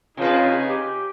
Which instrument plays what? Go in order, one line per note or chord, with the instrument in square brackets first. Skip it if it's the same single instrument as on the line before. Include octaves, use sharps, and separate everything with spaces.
[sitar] C3 B4 [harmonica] D#4 G#4 [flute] F4
[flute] G4